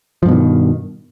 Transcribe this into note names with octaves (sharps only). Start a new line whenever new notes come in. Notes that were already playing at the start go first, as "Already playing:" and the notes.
G2 B2 D#3 F3